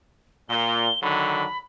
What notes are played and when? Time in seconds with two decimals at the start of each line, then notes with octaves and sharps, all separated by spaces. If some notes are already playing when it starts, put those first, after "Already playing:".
0.50 A#2 G7
1.03 D3 D#3 F#3 B5